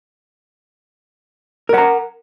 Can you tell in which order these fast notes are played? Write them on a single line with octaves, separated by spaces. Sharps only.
A#4 F#5 A#5